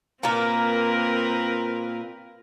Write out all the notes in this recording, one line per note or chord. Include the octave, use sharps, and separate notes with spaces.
A#2 A#3 C4 A#4 B4